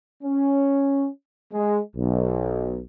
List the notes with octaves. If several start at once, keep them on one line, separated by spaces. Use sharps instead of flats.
C#4
G#3
B1